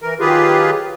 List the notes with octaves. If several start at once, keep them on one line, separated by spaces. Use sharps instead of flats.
E3 A#4
D#3 F#3 F4 G4 G#4 B4